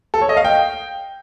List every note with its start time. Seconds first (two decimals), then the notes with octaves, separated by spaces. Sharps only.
0.14 A4
0.21 C#5
0.29 D#5
0.37 F5
0.45 G5